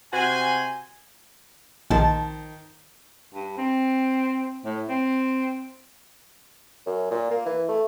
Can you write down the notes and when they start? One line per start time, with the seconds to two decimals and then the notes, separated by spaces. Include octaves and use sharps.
0.13 C3 F#4 C5 G#5
1.90 A#1 D#3 F3 A5
3.34 G2
3.57 C4
4.65 A2
4.89 C4
6.87 F#2
7.11 A#2
7.31 A#3
7.46 E3
7.69 A3